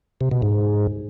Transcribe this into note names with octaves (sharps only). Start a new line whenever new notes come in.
C3
B2
G#2